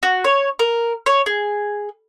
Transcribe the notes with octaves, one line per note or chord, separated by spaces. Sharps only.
F#4
C#5
A#4
C#5
G#4